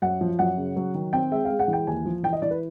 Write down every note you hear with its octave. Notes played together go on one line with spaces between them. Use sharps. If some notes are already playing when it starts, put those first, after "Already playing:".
F#2 F#5
F3
F#2 F#5
C#3
F#3
D#3
C4 G5
G#3 E5
G#3 F5
F#5
E3
G5
D#2 G#5
F3
E3 G5
D#5
E3 D5
B4